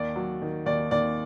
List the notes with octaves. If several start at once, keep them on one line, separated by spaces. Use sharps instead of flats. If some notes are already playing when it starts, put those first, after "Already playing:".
Already playing: D#2 D5
F#3
D#3
D#2 D5
D#2 D5